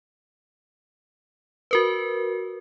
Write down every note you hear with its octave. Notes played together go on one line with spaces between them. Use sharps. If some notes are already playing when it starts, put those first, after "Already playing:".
F#4 A#4 B4